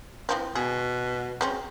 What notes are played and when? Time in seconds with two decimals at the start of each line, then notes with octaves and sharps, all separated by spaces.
0.29 E3 F3 C4
0.55 B2 G#4
1.41 G#3 C4 C#4